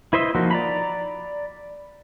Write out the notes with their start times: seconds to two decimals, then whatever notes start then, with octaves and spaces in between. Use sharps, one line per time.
0.13 E4 B4 C5 D#5 E5
0.35 F3 A#3 D#4 F#4
0.51 D5 A#5 B5